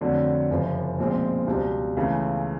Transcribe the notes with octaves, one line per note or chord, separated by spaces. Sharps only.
F2 D3 F#3 A3 D4
F#1 F#2 C#3 F3
B1 A#2 F3 G#3 C4
C#2 B2 G3
C#2 C#3 E3 A3